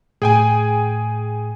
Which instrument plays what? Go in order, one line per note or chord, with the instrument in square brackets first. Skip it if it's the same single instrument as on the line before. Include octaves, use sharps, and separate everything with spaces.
[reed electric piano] A2 [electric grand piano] G#4 G5 G#5